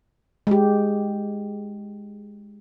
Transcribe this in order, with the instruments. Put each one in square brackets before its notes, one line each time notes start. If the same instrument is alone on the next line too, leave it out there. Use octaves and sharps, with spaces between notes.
[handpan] G#3 G4